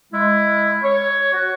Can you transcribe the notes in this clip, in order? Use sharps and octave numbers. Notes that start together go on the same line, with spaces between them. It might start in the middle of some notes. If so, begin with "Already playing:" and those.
G#3 E4
C#5
F#4